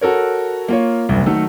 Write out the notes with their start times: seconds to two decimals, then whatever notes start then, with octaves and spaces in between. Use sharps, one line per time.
0.01 F#4 A4 A#4 C#5
0.68 A#3 F4 C#5
1.09 F#1 C2
1.26 D#3 F#3 A3 A4